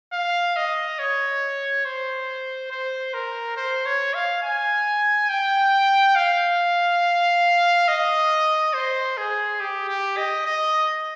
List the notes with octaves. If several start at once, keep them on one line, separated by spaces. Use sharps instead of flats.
F5
D#5
C#5
C5
C5
A#4
C5
C#5
F5
G#5
G5
F5
D#5
C5
G#4
G4
G4
D#5
D#5